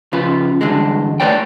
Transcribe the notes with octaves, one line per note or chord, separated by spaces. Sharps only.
C#3 F3 F4 B4
G2 D3 E3 G#3
A3 B3 B4 C#5 D5 G5